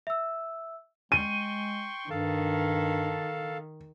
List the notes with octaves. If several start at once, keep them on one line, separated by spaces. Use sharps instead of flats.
E5 E6
G#3 G5 C6 C#6 D#7
G2 D#3 A4 F5 A5